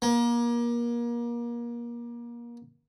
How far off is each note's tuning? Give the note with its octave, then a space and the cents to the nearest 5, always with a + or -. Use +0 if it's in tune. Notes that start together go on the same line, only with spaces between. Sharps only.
A#3 +30